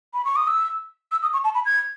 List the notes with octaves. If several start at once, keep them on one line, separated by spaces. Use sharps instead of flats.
B5
C#6
D#6
E6
E6
D#6
C#6
A5
B5
G#6